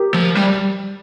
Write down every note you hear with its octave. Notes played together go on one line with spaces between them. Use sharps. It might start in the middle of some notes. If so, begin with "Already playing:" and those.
Already playing: G4 A#4
F3
G3